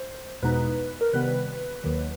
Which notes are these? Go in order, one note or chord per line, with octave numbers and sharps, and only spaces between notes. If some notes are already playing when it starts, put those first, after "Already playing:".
Already playing: C5
E2 B2 G#3 B3 D#4 B4
A#4
C3 D#3 G3 B3 B4
D#2 D#3 F#3